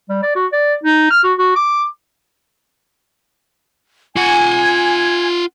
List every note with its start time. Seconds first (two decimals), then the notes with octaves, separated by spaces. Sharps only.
0.09 G3
0.22 D5
0.35 F#4
0.52 D5
0.83 D#4
1.11 F6
1.24 F#4
1.38 F#4
1.56 D6
4.16 F4 F#5 G#5 G#6